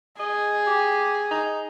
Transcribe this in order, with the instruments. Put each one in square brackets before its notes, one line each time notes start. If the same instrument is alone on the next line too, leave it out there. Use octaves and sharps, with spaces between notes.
[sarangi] G#4 [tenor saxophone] D#5
[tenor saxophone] G4
D#4